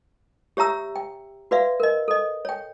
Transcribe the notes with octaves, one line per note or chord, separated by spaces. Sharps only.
G4 C#5 E5 A#5 E6
G5
F#4 B4 D5 E5 F5
A#4 D#5
A4 D#5
C#5 G5